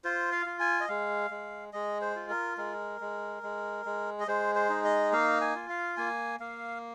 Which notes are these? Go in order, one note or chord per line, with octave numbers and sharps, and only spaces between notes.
F4 C5
F5
F4
G#5
D#5
G#3 F5
G#3
G#3 D#5
C5
F4
A#4
G#3 A#4
G#3
G#3
G#3
D#5
G#3 C5
C5
D#4
D#5
A#3 F5
G#5
F4
F5
A#3 G#5
A#3 F5